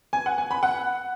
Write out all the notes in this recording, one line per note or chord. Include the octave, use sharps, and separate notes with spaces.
G#5
F#5
G#5
B5
F#5